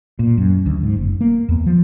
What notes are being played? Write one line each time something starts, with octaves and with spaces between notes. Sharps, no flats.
A#2
F#2
D2
G#2
F#1
A#3
E2
F3